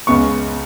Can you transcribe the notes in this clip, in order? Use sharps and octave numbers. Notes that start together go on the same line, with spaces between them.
C#2 C#3 G#3 B3 C#6